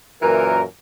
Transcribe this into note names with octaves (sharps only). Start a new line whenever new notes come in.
F#2 A#2 E3 A#4